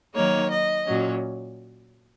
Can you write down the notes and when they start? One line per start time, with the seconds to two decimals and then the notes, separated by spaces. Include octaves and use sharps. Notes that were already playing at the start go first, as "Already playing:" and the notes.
0.14 D#3 F#3 A#3 D#4 C#5
0.51 D#5
0.85 A#2 F#3 C#4